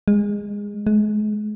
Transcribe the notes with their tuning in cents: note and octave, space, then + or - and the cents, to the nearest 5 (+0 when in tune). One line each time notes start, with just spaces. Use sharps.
G#3 -20
G#3 +35